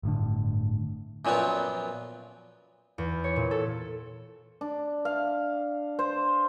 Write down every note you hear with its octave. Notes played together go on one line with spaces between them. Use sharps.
G1 A2 D3
F#2 A#2 F3 F#3 B3
E2
C#5
A#2
A4
D4
F5
C5